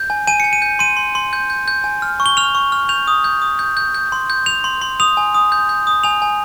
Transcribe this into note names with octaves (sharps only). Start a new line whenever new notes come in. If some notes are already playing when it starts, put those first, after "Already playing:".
Already playing: G6
G#5
G#5 D#7
G#5 C#7
D#7
G6
C6 D#7
C6
C6
G6
G6
G6
G#5
F6
C#6
G7
F6 F7
C#6
F6
G6 F7
D#6
G6
D#6
G6
G6
G6
C6
G6
G6 F7
C6
C6
D#6 F7
G#5
D#6
G6
G6
D#6
G#5 F7
G#5